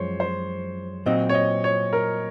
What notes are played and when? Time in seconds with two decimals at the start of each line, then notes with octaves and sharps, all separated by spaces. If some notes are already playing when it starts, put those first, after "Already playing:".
Already playing: F#2 F3 G#3 C5 C#5
0.20 C5
1.06 A#2 F#3 C4 D#4 D#5
1.29 C#5
1.34 D#5
1.64 C#5
1.93 A#4